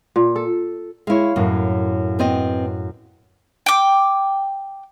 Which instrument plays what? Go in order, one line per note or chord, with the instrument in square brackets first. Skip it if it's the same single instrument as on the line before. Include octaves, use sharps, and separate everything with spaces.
[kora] A#2
A4
[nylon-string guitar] G#3 E4 [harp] C#5 F5
[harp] F#2 A2 [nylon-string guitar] A#3
[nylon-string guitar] B3 C4 D#5
[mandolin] G5 D6